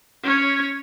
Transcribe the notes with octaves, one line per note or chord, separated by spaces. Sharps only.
C#4 C#5